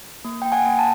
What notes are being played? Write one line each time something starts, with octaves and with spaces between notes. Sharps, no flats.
A#3
A#3 G5
F#5 G#5
A#3
G5 A5